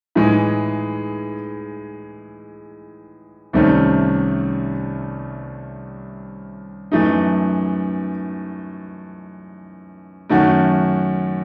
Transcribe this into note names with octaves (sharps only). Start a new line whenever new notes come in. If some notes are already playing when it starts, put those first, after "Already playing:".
A2 E3 G#3 D#4 G#4
C2 C3 D#3 A3 C#4
F#2 E3 A3 D#4
F#2 D#3 A3 C#4 F#4